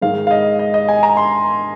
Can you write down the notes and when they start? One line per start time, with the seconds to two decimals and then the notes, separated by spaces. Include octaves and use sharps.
0.02 G#2 D#3 G#3 F5
0.27 F5
0.31 D#5
0.59 D#5
0.74 D#5
0.88 G#5
1.03 A#5
1.17 C6